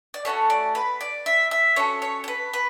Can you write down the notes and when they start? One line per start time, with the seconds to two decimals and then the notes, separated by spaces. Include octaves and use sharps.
0.14 D5
0.25 A3 C#4 F#4 A4 C#5
0.50 D5
0.75 B4
1.01 D5
1.26 E5
1.51 E5
1.76 C#4 F#4 A4 C#5
2.02 C#5
2.24 C#5
2.28 B4
2.53 B4